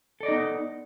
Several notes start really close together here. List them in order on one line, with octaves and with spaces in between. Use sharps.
A4 D5 D#5 D#4 B3